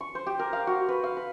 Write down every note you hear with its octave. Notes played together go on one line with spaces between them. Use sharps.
C#6
C5
G4
A#4
F5
F#4
B4
F5
B4